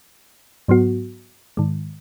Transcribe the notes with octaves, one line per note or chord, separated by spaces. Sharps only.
G#2 F#3 B3 F#4
G#2 D#3 G#3